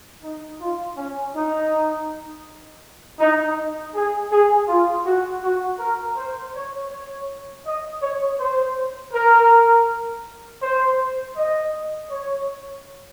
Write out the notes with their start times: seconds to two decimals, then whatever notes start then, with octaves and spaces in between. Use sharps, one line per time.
0.23 D#4
0.60 F4
0.97 C#4
1.35 D#4
3.20 D#4
3.94 G#4
4.31 G#4
4.68 F4
5.06 F#4
5.43 F#4
5.79 A#4
6.17 C5
6.55 C#5
6.91 C#5
7.65 D#5
8.02 C#5
8.39 C5
9.13 A#4
10.63 C5
11.37 D#5
12.11 C#5